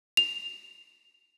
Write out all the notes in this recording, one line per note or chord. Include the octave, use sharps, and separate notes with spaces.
F7